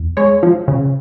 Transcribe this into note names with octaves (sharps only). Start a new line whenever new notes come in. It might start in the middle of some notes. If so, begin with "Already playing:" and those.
Already playing: E2
G#3 C#5
F3
C#3